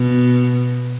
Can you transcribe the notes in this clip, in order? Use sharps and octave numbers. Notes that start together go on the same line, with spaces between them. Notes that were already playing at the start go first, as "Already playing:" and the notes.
Already playing: B2